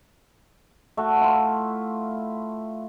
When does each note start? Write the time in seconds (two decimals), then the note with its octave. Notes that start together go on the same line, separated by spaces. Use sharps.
0.97 A3 F#4
1.21 E4 F4